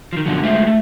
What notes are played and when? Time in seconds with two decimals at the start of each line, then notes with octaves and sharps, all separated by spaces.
0.13 D#3 F3
0.26 F#2 B2 D3 F3 F#3
0.43 G#3 A3 F4 C5 E5
0.67 A3